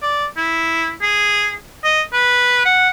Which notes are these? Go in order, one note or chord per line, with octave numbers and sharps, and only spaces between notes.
D5
E4
G#4
D#5
B4
F#5